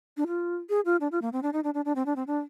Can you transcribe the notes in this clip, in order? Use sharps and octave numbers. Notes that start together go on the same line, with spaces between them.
D4
F4
G#4
F4
D4
F4
A#3
C4
D4
D#4
D4
D4
D4
C4
D4
C4
D4